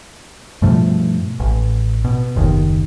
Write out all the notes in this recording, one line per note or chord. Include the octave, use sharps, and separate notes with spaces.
G2 B2 F3 A3
A1
B2
F#1 D#2 D#3